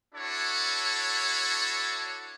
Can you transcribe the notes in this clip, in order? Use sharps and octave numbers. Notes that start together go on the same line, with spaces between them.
D4 E4 F#4 A4 C#5